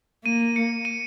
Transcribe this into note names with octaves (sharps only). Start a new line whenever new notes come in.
A#3 D#7
C#7
D#7